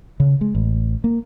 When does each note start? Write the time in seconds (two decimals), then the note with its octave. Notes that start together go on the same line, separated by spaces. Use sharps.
0.20 C#3
0.41 G#3
0.55 A1
1.04 A#3